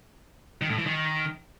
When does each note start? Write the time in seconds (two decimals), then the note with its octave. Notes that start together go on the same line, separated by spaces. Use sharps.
0.61 D#3
0.70 A2
0.78 E3
0.86 D#3